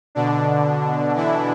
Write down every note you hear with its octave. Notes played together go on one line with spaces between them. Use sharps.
B2 D3 D4
E3 E4